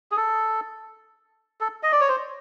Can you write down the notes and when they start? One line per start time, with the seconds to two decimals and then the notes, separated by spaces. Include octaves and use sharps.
0.12 G#4
0.17 A4
1.61 A4
1.83 D#5
1.92 D5
2.01 C#5
2.09 C5